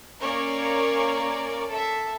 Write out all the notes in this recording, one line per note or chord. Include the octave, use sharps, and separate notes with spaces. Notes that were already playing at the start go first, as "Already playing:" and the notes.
A#3 C#4 A#4 C#5 D5
A4 E5